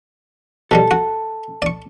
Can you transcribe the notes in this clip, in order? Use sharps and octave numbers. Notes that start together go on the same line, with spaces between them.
B2 D#3 G3 A4
F#4
D5 C#6